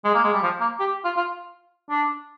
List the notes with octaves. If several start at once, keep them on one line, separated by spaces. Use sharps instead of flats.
G#3
A#3
G#3
G3
F3
A#3
G4
F4
F4
D4